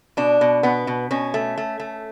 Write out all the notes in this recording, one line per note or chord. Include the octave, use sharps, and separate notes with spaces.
B2 D4
B2
B2 B3
B2
B2 C#4
A3
A3
A3